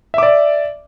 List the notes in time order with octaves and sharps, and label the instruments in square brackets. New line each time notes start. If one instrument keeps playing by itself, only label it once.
[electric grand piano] E5
D6
D5